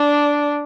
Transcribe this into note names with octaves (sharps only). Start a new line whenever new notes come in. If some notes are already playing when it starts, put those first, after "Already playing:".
Already playing: D4